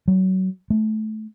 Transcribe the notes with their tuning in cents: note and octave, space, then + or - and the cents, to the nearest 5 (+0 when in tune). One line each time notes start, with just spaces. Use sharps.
F#3 +25
A3 -20